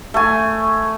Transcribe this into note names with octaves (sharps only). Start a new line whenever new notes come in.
A3 G#5